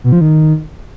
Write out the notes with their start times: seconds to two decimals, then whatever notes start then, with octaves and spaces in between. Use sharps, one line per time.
0.04 B2
0.12 F3
0.21 D#3